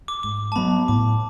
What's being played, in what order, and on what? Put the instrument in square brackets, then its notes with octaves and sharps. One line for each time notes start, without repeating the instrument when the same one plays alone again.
[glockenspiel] D6
[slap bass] G#2 [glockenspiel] D6
[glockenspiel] A5
[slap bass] F#3 B3 [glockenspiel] B5
[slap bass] A2 [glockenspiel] D6